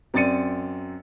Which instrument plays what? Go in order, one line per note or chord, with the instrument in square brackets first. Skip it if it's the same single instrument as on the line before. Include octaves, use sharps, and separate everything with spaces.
[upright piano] F#2 C4 D5 A6 C#7 D#7